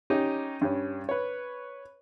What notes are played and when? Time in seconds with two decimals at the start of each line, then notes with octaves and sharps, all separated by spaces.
0.10 C#4 D#4 G4
0.61 G2 G3 C#4
1.09 B4 C#5